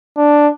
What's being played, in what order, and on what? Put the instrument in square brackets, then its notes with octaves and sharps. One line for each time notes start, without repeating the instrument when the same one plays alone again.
[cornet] D4